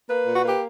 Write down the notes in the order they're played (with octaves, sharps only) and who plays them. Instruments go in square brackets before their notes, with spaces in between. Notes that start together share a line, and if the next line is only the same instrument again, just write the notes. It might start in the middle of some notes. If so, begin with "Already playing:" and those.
[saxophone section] A#3 B4
A#2
F#4
A#3 G4